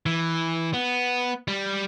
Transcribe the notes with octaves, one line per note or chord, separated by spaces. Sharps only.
E3
B3
G3